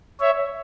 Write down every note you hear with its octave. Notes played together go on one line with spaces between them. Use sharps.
C#5 E5